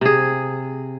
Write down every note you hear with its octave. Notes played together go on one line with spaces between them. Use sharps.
C3 G#4